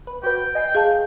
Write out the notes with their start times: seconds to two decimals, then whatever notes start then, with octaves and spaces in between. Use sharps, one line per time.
0.07 B4
0.24 F#4 B4 G5
0.55 D#5 G#5 C7
0.75 G#4 F5 A5